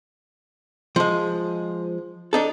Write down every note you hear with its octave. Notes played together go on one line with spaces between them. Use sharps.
F3 G#3
D4 D#4 A4